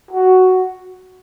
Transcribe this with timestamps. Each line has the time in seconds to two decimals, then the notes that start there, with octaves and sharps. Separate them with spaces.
0.11 F#4